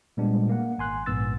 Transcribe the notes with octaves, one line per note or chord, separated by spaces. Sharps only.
A#2 G3 G#3 B3 D4
A#3 F#5
G#1 G#5 C6 F#6
A#1 G#2 B3 E6 A6